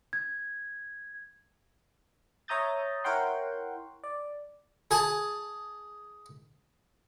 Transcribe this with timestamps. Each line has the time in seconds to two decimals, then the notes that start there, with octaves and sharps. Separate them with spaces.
0.13 G#6
2.48 C#5 E5 A#5 D#6 G6 A6
3.04 E4 A#4 C#5 F#5 G5 C6
4.04 D5
4.91 G#4 G#5 A5